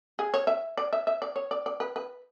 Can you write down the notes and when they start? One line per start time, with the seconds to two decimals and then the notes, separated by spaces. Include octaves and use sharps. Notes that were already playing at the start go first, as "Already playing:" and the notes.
0.19 G#4
0.34 C#5
0.47 E5
0.77 D5
0.93 E5
1.07 E5
1.22 D5
1.36 C#5
1.51 D5
1.66 D5
1.80 B4
1.96 B4